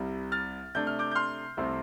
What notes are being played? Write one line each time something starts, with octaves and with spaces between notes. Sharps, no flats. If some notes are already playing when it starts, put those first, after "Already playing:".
Already playing: C2 C3 G3
F6 A6
C3 A3 D4 G6
F6
D6 G6
G6
C6 F6
C2 C3 A3 C4